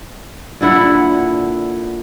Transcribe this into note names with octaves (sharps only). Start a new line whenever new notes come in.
A#2 D3 E4 F#5